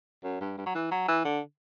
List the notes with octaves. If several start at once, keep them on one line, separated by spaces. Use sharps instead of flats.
F#2
G2
G2
F#3
E3
F#3
E3
D3